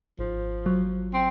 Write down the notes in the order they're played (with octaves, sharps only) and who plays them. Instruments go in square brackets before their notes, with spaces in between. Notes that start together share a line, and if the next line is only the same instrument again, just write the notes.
[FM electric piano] G#1 [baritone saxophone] F3
[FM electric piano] F#3
[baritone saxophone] C4